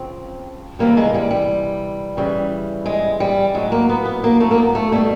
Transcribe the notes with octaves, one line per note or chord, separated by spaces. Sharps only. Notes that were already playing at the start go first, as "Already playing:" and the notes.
Already playing: C#3 F3 C4
C3 E3 G3 A#3
G#3
G3
G3
C#3 E3 G3
G#3
G3
A2 F#3 G#3
A#3
B3
B3
A#3
A3
A#3
B3
A3
B2 G3 A3